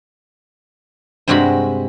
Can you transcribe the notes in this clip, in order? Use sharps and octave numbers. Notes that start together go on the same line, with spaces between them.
G2 C3 G3 G#3 F#4 B5